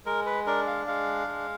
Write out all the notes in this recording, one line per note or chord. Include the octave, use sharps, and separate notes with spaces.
G#3 A#4
B4
D4 A#4
F5
G#3 F5
G#3